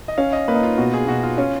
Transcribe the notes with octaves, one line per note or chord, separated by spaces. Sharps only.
D#5
C#4 F5
D#5
A#3 B4
D#4
F4
B2 F#4
G#4
B2 F#4
F4
C#4 F4